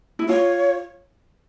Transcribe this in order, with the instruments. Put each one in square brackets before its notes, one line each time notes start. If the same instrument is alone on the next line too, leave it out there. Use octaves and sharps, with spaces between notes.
[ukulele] E4
[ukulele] F4 [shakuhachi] C#5